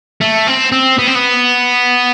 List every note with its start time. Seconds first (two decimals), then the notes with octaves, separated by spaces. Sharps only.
0.21 A3
0.48 C4
0.72 C4
0.99 B3
1.08 C4
1.15 B3